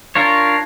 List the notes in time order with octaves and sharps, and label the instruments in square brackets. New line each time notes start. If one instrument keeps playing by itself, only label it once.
[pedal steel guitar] D4 F4 A#4 C#5